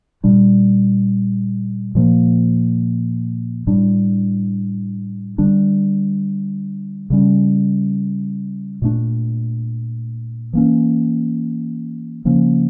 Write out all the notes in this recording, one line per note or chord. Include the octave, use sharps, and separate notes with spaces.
A#2 G3 D4
A#2 F3 A#3
A2 G3 D4
D3 G3 D4
C#3 G3 C#4
A#2 A3 D4
E3 A#3 C#4
C#3 F3 A#3 C#4